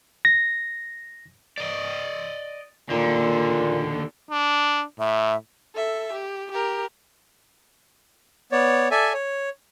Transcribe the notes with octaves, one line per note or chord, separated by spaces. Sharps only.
A#6
D5 D#5
D#2 A#2 D3
D4
A2 E5
A4 E5
G4
G4 A#4
B3 C#5 D5
A4 D5 E5 G#5
C#5